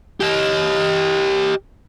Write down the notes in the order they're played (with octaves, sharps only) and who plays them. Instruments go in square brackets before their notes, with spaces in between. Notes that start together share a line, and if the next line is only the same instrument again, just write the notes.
[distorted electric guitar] G4 D#5